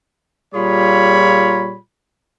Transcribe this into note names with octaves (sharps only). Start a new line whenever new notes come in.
A#2 G3 F4 G#4 C#5 B5